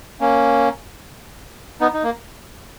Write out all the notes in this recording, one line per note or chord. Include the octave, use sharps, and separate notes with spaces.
A#3 C#4
B3 D#4
D#4
A#3